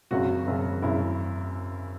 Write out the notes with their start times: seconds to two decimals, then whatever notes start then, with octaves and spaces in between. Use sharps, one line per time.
0.11 G#1 F#2 C#3 F#4
0.47 G#1 F#2 C#3
0.82 G#1 F#2 C#3 E4